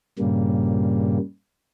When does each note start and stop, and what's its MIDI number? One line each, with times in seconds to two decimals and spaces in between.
0.19 1.18 43
0.19 1.18 46
0.19 1.18 49
0.19 1.18 55
0.19 1.18 58